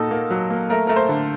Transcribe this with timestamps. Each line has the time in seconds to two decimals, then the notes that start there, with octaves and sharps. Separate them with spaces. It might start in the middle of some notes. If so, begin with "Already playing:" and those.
Already playing: A#2 D#4 F#4 A4
0.11 A#3
0.31 F#3
0.50 A#3
0.70 A3 A#4
0.87 A3 A#4
0.96 C5
1.09 D3